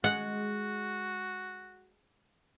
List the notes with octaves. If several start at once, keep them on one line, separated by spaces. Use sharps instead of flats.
G#3 F#4 F#5